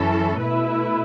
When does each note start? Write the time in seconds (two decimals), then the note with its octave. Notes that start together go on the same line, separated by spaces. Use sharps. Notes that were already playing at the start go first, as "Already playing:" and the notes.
Already playing: F#2 E3 C#4 A4
0.38 B2 A3 E4 B4